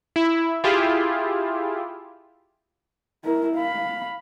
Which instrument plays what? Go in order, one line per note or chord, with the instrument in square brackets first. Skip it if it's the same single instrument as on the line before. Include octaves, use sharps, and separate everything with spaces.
[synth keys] E4
E4 F4 G4 G#4
[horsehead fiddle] E4 A#4
F5 B5